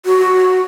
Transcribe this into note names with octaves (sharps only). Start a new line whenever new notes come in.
F#4